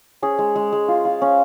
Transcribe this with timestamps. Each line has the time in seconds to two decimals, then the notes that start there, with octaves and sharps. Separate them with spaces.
0.22 C#4 G#4
0.39 G#3
0.56 G#3
0.73 G#3
0.88 F4
1.05 F4
1.22 C#4